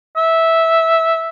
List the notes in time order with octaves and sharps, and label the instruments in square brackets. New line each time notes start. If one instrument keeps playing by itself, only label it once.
[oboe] E5